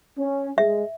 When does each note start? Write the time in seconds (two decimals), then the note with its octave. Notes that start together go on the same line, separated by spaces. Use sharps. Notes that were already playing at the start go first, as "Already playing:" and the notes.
0.18 C#4
0.58 G#3 E5